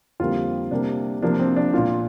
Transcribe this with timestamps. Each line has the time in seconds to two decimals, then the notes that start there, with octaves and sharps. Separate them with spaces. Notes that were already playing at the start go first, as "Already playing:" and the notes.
0.20 F2 D3 G3 A#3 F4
0.71 C3 G3 A#3 D4
1.22 C3 F3 A#3 D4
1.40 C4
1.56 D4
1.74 A#2 A#3 F4